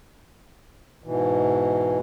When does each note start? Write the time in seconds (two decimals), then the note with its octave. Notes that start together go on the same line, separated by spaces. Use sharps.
1.04 G#2 B2 E3